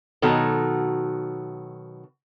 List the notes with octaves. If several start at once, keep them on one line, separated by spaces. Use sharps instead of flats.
B2 D#3 F#3 F#4 A4